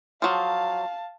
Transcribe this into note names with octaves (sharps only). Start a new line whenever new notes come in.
F3 F#3 F5 A5